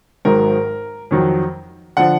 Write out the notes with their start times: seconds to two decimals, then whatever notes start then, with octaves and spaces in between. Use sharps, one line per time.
0.25 G#1 G#2 D#3 F#3 A#4
1.11 F2 D#3 F#3
1.97 D3 F3 F#5